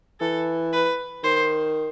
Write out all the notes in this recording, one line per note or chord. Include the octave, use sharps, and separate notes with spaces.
E3 A4
B4
D#3 C5